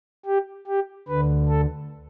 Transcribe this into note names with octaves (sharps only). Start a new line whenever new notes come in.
G4
G4
D2 D3 B4
A4